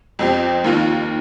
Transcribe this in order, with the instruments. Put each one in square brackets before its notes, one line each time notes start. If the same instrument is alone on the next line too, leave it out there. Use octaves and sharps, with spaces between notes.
[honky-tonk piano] F2 F3 C4 G4
D#2 D#3 A#3 F4